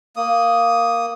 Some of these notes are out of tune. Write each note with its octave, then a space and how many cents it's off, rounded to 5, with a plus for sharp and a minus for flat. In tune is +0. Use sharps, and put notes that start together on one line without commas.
A#3 +0 D#6 +0